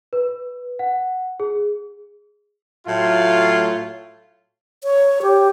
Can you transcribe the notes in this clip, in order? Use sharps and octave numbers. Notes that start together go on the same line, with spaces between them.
B4
F#5
G#4
A2 F#3 A3 F4
C#5
G4